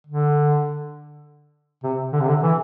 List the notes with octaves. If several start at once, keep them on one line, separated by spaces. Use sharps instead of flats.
D3
C3
D3
C3
D3
E3